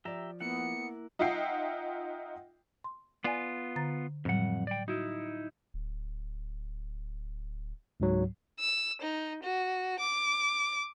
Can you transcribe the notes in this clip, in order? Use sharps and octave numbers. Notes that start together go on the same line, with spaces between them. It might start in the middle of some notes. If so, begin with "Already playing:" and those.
F3 G4 D5 E5 A#5
A#3 B3 E4 F#5 C#7
D#4 F4 E5 F#5 G5 C7
C6
B3 F4 D5 G#5
D3 A#5 A6
F2 A2 F#3 G3 F#5
D5 G5
D#4 E4 F#4
D1
C#2 G#2 F#3
E6
D#4
F#4
D6